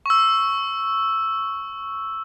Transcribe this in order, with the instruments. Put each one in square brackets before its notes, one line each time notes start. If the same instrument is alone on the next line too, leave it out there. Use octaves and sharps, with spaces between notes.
[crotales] C#6 E6